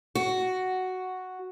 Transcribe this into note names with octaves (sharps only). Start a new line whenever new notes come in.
F#4